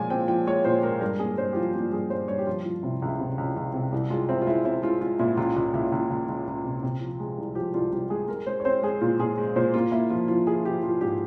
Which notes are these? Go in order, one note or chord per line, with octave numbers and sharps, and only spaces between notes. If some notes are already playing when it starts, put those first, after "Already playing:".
Already playing: A#2 F3 G#3 G#5
C4 G5
F3 G5
G#3 C#5
A#2 C5
G#3 A#4
G2 A#4
A#3 G#4
G2 C5
G4
F3 F4
A#3 F4
G2 G#4
G2 C5
G2 C#5
G4
F3 F4
F3
C3 E4
C#2
E4
C3
C#2
C#2
C3
C2
G#3 F4
C4 E4
F4
G#3 E4
C4 E4
G#3 F4
G#3 F4
A#2 E4
C#2 F4
C#2 F4
C#2 E4
E4
C#2 F4
C#2
C#2
C#2
C3
C3
F3
G#3
C2
F3 G4
C2 F4
C2 G4
G#3 G#4
G#3 A#4
G#3 C5
C#5
C4 C5
G#3 G#4
A#2 F4
A#2 G#4
G#3
A#2 C5
A#3 F4
A#3 E4
F3 F4
F3 F4
F3 G#4
F3 G4
F3 F4
G#2 G4